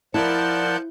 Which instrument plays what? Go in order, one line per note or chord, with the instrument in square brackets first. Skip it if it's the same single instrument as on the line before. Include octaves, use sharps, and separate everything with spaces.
[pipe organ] F3 F#5 G6 [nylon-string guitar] E4 [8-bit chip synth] A#4 D5 A5